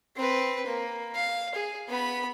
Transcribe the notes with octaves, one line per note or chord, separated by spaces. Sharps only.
C4 B4
A#3
F5
G#4
B3 B5